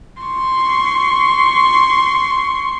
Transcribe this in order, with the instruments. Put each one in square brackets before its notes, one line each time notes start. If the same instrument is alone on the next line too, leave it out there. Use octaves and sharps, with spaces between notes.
[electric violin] C6 C#6